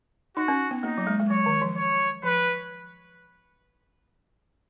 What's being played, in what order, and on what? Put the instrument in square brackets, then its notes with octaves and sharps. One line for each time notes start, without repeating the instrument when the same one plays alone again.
[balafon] D#4 [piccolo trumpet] F#4
[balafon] C#4
B3
[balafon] A#3 [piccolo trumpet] D#4
[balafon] F#3
G#3
G#3
[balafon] F#3 [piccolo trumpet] C#5
[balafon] D#3
F3
[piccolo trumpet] C#5
[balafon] F3 [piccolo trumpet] B4